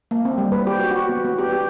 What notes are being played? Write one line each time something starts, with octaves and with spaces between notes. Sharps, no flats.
A#3
C4
G3
B4
G4
F#4
F#4
B3
B3
G4
G4